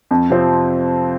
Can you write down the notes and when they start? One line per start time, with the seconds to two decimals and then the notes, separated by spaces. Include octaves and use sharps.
0.11 F2
0.30 C3 F3 C4